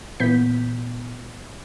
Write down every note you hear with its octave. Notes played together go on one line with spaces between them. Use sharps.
A#2 E3 B3 G6 B6